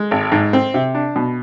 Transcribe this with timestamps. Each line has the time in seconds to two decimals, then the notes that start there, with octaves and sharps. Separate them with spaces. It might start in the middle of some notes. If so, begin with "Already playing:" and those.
Already playing: G#3
0.11 G#1
0.32 G#2
0.53 C4
0.74 C3
0.95 D4
1.16 B2